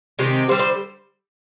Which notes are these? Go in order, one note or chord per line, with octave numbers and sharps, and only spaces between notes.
C3 D#3 G#3 C4 G4
D3 G3 A#3 C5
C5